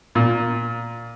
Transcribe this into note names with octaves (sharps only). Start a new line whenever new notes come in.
A#2